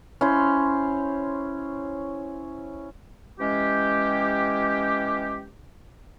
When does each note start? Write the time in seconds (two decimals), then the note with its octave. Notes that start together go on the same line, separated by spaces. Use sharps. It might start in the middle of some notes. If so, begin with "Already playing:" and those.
0.21 C#4 E4 C5
3.40 E3 G#3 C#4 G4